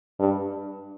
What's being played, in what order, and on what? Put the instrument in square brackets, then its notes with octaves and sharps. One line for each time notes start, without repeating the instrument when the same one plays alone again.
[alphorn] G2